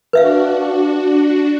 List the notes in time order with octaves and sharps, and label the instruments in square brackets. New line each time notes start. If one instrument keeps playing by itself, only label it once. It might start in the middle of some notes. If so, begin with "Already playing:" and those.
[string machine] D4 F#4 [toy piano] B4 E5 F5